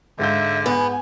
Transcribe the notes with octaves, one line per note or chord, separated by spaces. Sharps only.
G#2 D3 E5 F5 G6
B3 G#5